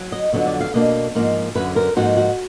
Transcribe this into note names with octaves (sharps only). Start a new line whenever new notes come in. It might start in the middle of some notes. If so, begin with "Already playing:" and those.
Already playing: F#3
D#5
F2 D3 F#3 B3 D#5
D5
F5
B2 A#3 D4 D#5
G#2 F3 A#3 D#4
F#2 D3 F#3 B4
A#4
G#2 F3 A#3 D#4 F#4
F#4